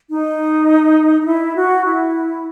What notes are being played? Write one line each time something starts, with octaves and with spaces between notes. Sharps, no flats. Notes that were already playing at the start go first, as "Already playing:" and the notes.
D#4
D#4
E4
F#4
E4